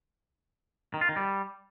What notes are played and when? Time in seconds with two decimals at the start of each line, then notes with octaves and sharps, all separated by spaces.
0.94 D#3
1.01 F4
1.09 D#3
1.16 G3